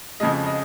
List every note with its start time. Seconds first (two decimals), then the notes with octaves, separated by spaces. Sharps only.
0.20 F2 C#3 F3 G#3 D#5
0.46 D#5